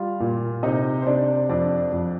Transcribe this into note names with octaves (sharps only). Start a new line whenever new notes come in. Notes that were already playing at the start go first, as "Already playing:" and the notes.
Already playing: G3 F4 F5
A#2
C3 D#4 D#5
C5
C3 D4 D5
F2 D4 D5
F2